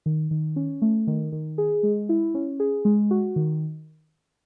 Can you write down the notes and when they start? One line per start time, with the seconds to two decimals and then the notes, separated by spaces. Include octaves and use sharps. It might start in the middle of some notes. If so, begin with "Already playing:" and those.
0.06 D#3
0.31 D#3
0.56 C#4
0.82 A3
1.07 D#3
1.32 D#3
1.58 G#4
1.83 G#3
2.09 E4
2.34 C#4
2.60 G#4
2.85 G#3
3.11 F#4
3.36 D#3